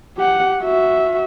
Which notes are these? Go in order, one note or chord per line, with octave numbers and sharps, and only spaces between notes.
G4 F#5
F#4 E5